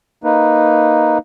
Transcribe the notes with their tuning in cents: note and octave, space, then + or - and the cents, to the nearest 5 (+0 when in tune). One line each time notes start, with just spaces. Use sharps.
A#3 +0 D#4 +0 B4 +0